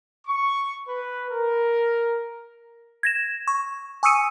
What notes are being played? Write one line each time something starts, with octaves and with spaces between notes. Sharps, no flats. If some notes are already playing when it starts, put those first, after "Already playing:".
C#6
B4
A#4
G#6 A#6 E7
C#6
G#5 C#6 D#6 E6 C#7 D#7